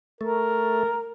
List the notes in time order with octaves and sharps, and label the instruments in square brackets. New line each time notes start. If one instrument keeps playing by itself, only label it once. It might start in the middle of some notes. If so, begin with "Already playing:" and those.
[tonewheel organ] A3 [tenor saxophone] A#4